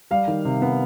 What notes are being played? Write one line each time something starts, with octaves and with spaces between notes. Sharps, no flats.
G3 F5
D#3
C3
B3